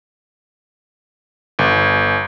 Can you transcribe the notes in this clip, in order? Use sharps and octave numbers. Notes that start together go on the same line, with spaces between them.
G1